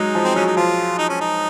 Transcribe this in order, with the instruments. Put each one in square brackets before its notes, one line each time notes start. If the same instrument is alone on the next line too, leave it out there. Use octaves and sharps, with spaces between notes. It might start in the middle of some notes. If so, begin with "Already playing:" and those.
Already playing: [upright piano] F#3 G#3 [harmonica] D#4
[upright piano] F3
[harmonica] C4
[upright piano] F#3 [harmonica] C#4
[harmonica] D#4
[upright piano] F3 [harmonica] F4
[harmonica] D#4
C#4
D#4